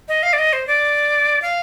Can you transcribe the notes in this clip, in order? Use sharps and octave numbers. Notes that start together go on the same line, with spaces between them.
D#5
F5
D5
D#5
C5
D5
F5